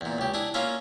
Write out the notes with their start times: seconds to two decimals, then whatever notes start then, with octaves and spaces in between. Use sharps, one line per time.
0.01 E2 A#2
0.18 C#2 G4
0.34 D4 E4 G#4
0.54 A#3 C#4 F4 E5 F5